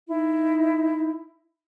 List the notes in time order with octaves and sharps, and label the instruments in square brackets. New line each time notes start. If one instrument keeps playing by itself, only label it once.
[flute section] D#4 E4